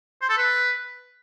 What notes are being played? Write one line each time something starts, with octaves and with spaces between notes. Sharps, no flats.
C5
A4
B4